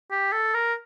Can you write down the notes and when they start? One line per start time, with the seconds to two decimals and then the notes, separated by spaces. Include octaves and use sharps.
0.11 G4
0.32 A4
0.54 A#4